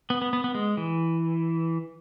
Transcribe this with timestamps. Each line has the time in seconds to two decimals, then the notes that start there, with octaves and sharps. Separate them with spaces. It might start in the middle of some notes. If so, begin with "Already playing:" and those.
0.10 B3
0.22 B3
0.33 B3
0.44 B3
0.55 G#3
0.77 E3